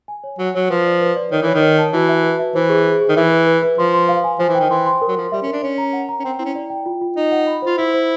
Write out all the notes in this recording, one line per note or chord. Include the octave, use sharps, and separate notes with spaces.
G#5
C#5
F#3 C#5
F#3 C#5
F3 B4
D5
B4
D5
D#3 C#5
E3 C#5
D#3
C#5
A5
E3 F#4
E5
B4
E5
E3 C5
G#4
G#4
G#4
D#3
E3 E5
B4
B4
B4
F3 C6
C6
F5
G#5
F3 C5
E3
D#3 G5
E3 C6
C6
A#4
F#3
F3 A#4
G3 E5
C#4
A#4
D4
C#4 C#5
A#5
F#5
A#5
C#4
C4 G5
C4 E4
C#4
D5
G5
F4
F4
D#4 F4
F#5
B5
F4 C5
E4 C5
C5